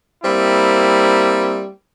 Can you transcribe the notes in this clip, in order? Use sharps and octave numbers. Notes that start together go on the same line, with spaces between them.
G3 A#3 C4 E4